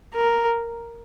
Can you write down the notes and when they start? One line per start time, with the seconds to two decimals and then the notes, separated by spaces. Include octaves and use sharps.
0.14 A#4